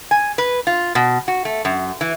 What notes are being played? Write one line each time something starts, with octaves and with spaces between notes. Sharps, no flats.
G#5
B4
F4
B2
F#4
A3
F#2
E3